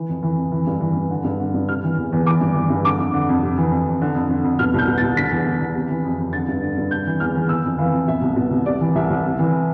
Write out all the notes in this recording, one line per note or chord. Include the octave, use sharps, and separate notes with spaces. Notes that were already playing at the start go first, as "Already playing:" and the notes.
Already playing: E3
F2
E3
F2
E3
G2
E3
G2
D3
G2
D3
G2
C3 F6
E3
E2
E2
E3 D6
G2
E3
G2
D3 D6
F2
D3
F2
C3
E3
F2
F2
D3
F2
D3
F2
B2 F6
C2 G6
B2
A6
C2
D3 B6
E2
D3
E2
C3
E3
F2
F2
D3 A6
G2
D3
G2
C3 G6
E3
E2 F6
E2
E3 E6
F2
E3 F5
F2
B2 E5
C2
B2
C2
C3 D5
E3
C2 E5
C2
C3
E3